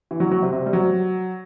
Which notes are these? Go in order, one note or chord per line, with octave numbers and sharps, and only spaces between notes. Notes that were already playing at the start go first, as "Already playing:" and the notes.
E3
F#3
F#3
C3
C3
G3
F#3